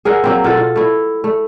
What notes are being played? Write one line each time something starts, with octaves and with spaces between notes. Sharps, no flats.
G#4 A#4 E5 F#5
F#3 A#3 C4
B2 F4 A4
F4
A3 E4
A3